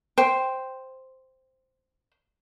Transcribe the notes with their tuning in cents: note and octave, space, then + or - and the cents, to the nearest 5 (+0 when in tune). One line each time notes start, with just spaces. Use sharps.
C5 +0 G5 +0